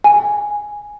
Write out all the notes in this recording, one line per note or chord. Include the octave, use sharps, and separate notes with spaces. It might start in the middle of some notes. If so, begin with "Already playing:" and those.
G#5